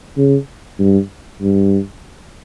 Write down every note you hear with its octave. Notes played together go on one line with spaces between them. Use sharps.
C#3
G2
G2